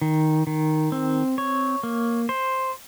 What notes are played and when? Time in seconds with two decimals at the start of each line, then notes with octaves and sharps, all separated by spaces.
0.01 D#3
0.47 D#3
0.92 C4
1.38 C#5
1.83 A#3
2.29 C5